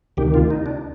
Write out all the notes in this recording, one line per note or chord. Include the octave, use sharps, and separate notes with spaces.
D2 C3 D#3 G4
F4
D#4
D4